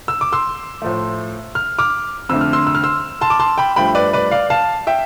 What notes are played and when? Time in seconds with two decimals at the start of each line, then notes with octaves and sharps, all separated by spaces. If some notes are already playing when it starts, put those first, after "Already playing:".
0.08 E6
0.21 D6
0.33 C6 E6
0.82 A2 F3 A3
1.55 F6
1.79 D6 F6
2.29 F2 D3 A3 E6
2.41 F6
2.53 C6 E6
2.67 E6
2.75 F6
2.84 C6 E6
3.21 A5 C6
3.30 D6
3.40 A5 C6
3.58 G5 B5
3.76 G2 F3 A3 G5 B5
3.95 B4 D5
4.13 B4 D5
4.31 D5 F5
4.50 F5 A5
4.87 E5 G5